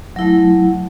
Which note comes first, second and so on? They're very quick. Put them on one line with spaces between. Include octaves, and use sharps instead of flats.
F#3 E4 A3